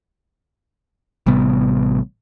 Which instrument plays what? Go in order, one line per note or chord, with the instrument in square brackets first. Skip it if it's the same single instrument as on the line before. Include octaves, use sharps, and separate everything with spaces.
[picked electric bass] A1 C3 G3 B3